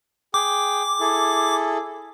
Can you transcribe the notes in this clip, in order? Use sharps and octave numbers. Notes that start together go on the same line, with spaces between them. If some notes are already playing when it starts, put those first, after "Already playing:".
G#4 G5 D6
E4 G#4 A4